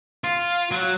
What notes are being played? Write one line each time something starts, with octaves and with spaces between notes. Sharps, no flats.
F4
F#3